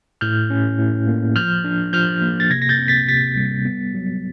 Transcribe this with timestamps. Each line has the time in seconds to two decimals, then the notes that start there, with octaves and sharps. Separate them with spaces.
0.21 A2 F6 G6
0.50 C#4
0.79 A2
1.07 A#3
1.36 F3 F6 G6
1.64 D4
1.93 F3 F6 G6
2.22 A#3
2.40 A6
2.50 C3 G#6 A#6
2.62 A#6
2.69 G6 A6
2.79 C4
2.88 A6 B6
3.07 C3 A6 B6
3.36 G3
3.65 B3
3.94 F#3